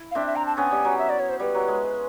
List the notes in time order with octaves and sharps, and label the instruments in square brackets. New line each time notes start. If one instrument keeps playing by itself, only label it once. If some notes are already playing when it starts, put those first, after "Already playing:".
Already playing: [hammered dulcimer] E4
[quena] F5
[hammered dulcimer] C4 D4 [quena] E5
[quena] E5
A#5
A5
[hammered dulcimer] B3 C#4 [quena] G#5
[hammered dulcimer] G3
F#3
[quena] E5
D5
C#5
C5
[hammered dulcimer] G3 [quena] B4
[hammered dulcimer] F#3
G#3